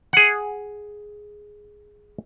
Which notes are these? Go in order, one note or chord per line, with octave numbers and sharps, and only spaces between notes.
G#4 F#5